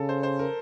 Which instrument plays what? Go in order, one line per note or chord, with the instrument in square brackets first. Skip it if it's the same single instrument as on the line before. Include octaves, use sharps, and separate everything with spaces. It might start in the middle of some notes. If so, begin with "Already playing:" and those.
Already playing: [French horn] C#3 [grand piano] A4
[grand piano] C5
C5
A#4